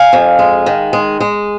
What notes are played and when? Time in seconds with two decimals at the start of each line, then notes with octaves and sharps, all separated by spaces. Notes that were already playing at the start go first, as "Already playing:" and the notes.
Already playing: F5 G#5
0.13 F2
0.39 G#3
0.66 D#3
0.93 G#3
1.20 G#3